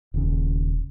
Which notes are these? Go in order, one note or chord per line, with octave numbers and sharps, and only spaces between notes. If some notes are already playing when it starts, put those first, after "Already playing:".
D#1 C#3